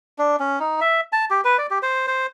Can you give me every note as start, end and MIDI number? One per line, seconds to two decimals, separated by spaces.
0.18 0.36 62
0.40 0.59 61
0.60 0.80 63
0.81 1.01 76
1.12 1.25 81
1.30 1.41 67
1.45 1.57 71
1.58 1.67 74
1.71 1.79 67
1.83 2.07 72
2.08 2.26 72